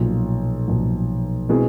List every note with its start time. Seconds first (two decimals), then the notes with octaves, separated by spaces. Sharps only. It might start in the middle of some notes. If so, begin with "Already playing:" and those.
Already playing: B1 A#2 F3
0.68 B1 A#2 F3
1.49 B2 G#3 C4 E4 G#4